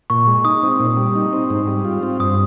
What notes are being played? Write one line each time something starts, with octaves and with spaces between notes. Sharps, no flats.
A#2 C#6
G#3
D#4 D#6
C4
A#2
G3
D#4
C4
G#2
G3
F4
C4
G2 D#6